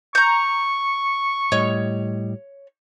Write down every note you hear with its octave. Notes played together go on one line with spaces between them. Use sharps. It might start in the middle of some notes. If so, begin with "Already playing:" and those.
A#5 C#6 G6
A2 G3 C#5 D#5